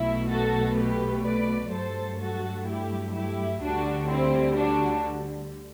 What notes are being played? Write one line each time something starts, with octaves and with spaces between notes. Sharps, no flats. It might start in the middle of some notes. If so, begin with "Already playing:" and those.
Already playing: B1 B2 A3 E4
F#4 A4
G4 B4
B4 D5
G2 F#3 A3 A4 C5
F#4 A4
E4 G4
E4 G4
D2 D3 G3 D4 F#4
C4 E4
D4 F#4